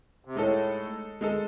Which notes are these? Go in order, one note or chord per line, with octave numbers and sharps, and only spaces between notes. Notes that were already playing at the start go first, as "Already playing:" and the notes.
C3
A2 G#3 D#4 A4
G#3 D#4 A4